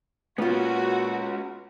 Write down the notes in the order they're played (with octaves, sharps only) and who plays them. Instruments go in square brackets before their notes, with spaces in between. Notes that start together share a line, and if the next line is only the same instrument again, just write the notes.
[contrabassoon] A#2 [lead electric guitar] G#3 C#4 [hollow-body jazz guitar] B3 F4 [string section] F#4